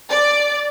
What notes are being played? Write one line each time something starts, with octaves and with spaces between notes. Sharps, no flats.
D5